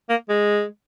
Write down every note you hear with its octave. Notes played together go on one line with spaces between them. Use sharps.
A#3
G#3